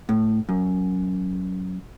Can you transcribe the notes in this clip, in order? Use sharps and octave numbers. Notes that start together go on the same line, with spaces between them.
A2
F#2